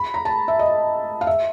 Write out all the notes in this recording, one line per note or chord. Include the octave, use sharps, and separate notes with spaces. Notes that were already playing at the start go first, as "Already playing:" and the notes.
Already playing: B5
A#5
A5
E5
D#5
F5
E5